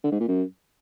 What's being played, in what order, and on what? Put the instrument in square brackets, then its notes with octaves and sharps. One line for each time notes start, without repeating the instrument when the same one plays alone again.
[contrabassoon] D3
G#2
A#2
F#2